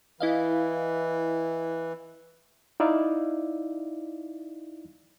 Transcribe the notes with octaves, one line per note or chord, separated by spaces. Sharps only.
E3 E4 D#5 F5
D#4 E4 D5 E5 F5